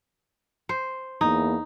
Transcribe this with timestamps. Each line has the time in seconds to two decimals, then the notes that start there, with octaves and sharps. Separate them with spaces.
0.69 C5
1.21 E2 A#3 D#4